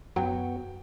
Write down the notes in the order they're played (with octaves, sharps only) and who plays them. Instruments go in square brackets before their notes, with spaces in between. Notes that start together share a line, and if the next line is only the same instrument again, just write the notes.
[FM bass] F#2 [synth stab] F#3 [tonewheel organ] B3 F#4 [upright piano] G5